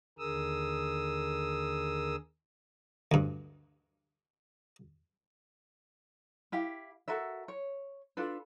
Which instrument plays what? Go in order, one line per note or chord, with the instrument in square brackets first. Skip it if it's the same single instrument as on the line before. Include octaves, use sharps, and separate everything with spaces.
[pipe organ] D#2 D3 G#4 A#4 D#6 E6
[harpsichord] D2 G2
[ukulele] E4 G4 F5
F#4 A4 A#4 E5
C#5
D4 F4 A4 B4